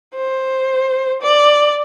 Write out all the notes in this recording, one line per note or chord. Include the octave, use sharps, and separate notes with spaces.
C5
D5